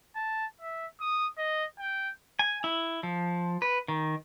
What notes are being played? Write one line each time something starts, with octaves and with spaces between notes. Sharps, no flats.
A5
E5
D#6
D#5
G5
G#5
E4
F3
B4
D#3